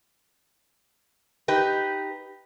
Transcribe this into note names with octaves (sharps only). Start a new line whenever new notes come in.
D#4 G4 B4